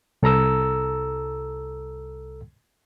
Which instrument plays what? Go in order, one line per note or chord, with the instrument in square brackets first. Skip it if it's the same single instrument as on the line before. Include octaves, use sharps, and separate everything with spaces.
[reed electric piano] C2 A4 A#5 E6